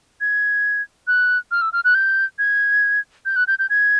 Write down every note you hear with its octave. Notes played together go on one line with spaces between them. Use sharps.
G#6
F#6
F6
E6
F6
F#6
G6
G#6
G6
F#6
G6
G6
G#6